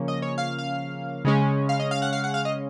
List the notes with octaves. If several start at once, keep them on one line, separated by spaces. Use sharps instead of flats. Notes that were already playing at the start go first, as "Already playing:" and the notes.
Already playing: C#3 F3 A#3 C#4
D#5
C#5
F5
F5
C#3 G#3 C#4
F5
D#5
F5
F#5
F5
F#5
F5
D#5